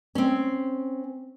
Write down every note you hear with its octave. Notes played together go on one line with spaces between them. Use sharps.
C4 C#4